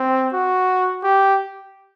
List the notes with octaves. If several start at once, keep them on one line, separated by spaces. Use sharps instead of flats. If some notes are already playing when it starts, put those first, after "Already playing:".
Already playing: C4
F#4
G4